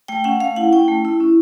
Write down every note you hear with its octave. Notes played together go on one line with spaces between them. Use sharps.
A3 G5
C#4 F#5
A3 F5
E4 F#5
C#4 G5
A3
E4
C#4